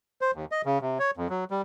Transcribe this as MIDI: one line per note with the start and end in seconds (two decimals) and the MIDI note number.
0.21 0.31 72
0.35 0.45 39
0.52 0.62 75
0.65 0.79 49
0.81 0.98 48
0.99 1.11 73
1.17 1.28 41
1.30 1.44 54
1.51 1.62 55